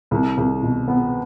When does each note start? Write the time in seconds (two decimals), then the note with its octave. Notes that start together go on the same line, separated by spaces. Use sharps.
0.11 C2
0.37 C2
0.62 B2
0.88 B3